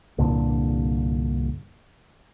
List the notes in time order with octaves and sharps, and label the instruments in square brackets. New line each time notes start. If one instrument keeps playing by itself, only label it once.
[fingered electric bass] C2 G2 A#2 D3